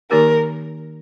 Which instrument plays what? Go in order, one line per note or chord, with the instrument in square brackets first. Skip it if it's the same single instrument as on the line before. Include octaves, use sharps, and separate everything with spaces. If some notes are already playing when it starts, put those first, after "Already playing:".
[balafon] D#3 A#3 D#4 G4 [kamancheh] A#4